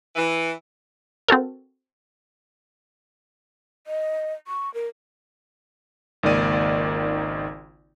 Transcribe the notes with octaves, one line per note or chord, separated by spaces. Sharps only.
E3
C4 F#4 A4 A#4
D#5
C#6
A#4
G#1 C#2 D#3 A#3 D5 D#7